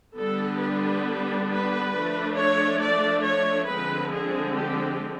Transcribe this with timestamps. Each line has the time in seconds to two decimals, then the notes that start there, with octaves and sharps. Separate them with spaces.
0.17 D3 G3 B3 D4 A4
0.61 B4
1.50 B4
1.93 F3 A3 D4
2.37 C#5
2.81 D5
3.25 C#5
3.69 D3 F3 G#3 C4 B4
4.13 G#4
4.57 G4